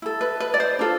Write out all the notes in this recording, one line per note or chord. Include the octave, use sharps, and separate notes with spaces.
E4 A4
B4
B4
D5
C5
D4 F4 A4